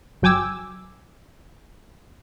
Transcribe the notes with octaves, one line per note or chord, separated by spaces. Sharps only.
G1 F#3 G5 G#5 D6 E6